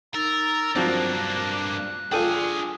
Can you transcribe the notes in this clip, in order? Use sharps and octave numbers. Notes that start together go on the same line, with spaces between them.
D#4 A#4 E6 A6
G2 F3 F#3 A#3 C4 D4 F#6
D4 F4 G#4 A4 G5 G#5